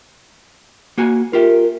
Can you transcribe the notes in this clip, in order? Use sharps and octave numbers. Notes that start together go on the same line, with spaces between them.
A#3 F#4 G#5
F4 G4 A#4 E5